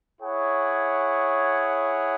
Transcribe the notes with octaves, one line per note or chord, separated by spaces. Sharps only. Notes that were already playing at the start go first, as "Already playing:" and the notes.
E4 G#4 C#5 F#5